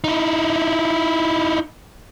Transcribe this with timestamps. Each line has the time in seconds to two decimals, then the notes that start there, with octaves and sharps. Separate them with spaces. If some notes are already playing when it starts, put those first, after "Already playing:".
0.04 D#4 E4